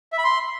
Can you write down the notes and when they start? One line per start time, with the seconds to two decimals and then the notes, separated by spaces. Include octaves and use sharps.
0.12 E5
0.18 B5
0.24 C6